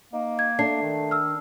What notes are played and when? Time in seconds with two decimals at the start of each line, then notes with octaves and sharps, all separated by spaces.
0.13 A#3 D#4
0.39 G#6
0.59 A3 D4 C7
0.83 D#3
1.11 E6 F6